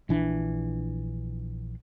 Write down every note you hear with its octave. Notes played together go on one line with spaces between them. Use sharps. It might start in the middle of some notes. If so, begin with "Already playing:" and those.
A#1 E3 D4